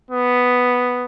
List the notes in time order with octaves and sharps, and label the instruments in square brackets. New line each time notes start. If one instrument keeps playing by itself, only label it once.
[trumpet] B3